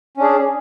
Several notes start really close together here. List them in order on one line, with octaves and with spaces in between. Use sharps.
C#4 D4 G#4